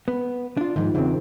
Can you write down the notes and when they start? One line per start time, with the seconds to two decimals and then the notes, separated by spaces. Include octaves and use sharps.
0.08 B3
0.57 D4 F4
0.76 G#2 D#3 F3
0.95 E2 C#3 C4